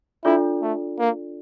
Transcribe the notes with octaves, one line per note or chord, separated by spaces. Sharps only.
D4 E4 F4 A4 D5
A3
A#3